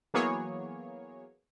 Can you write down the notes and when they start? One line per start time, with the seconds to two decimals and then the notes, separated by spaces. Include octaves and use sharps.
0.14 E3 F#3 A#3 B3 G#4 C#5